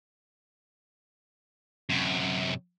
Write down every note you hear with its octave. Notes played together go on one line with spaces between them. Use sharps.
F#2 C3